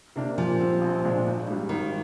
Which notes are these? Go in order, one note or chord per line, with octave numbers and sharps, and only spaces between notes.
C3 D#3 A#3 D4
A#2 F3
G3 C4
A#1
A#2 G#3 D4
G#1
G#2 G3
G#1 D#3